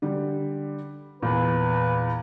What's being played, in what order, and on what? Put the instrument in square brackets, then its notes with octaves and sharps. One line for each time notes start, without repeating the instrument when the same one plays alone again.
[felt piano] D3 G3
[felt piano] E2 A#2 [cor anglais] B4